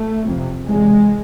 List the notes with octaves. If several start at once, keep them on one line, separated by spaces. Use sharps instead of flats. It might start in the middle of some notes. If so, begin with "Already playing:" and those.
Already playing: A3
F2 C3
E2 C3 G#3